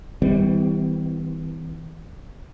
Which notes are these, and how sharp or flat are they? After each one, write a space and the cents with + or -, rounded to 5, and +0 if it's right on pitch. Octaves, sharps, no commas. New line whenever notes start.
E3 -40 G3 +0 B3 +45